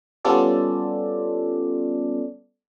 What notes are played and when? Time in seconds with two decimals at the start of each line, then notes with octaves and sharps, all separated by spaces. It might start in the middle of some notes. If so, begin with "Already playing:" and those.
0.25 G3 B3 C#4 F4 A4 D5